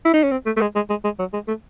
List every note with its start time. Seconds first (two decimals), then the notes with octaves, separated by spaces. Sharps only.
0.05 E4
0.13 D#4
0.23 C#4
0.31 C4
0.46 A3
0.57 A3
0.61 G#3
0.76 G#3
0.90 G#3
1.04 G#3
1.19 F#3
1.33 G#3
1.48 A3